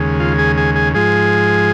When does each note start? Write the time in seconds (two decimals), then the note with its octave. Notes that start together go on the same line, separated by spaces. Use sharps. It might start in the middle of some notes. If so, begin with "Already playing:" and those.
Already playing: D#2 C#3 G#3
0.20 F4
0.39 G#4
0.57 G#4
0.76 G#4
0.94 G#2 F3 G#3 G#4